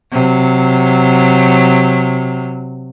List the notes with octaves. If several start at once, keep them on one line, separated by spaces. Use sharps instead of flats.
C3 F#3